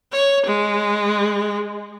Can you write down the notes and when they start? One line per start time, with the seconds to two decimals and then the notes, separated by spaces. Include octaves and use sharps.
0.12 C#5
0.46 G#3